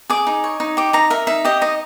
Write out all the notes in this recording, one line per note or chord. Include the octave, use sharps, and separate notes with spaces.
G#4 D6
D#4
C#5
D#4
G4 D6
D#4 A#5
A#4 E5
D#4 E5
G4 D#5
D#4 D#5